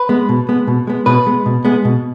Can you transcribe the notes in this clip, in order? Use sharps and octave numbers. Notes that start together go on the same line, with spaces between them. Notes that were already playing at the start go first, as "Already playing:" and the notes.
Already playing: B4
G#3 B3
B2
G#3 B3
B2
G#3 B3
B2 B4
G#3 B3
B2
G#3 B3
B2